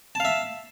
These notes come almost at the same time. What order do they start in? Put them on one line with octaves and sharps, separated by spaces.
A5 F5 E5